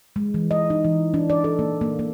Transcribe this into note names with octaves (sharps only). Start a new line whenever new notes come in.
G#3
E3
D#5
D#4
E3
D4
D5
A4
A#3
A#3
A#3